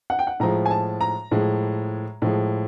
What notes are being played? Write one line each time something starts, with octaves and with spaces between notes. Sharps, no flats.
F#5
G5
F#5
A2 F3 G#3 A#5
G#5
A5
A#5
A2 F3 G#3
A2 F3 G#3